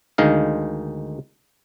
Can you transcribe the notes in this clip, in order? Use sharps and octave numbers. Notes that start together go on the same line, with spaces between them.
D2 D#3 G#3 D#4 F5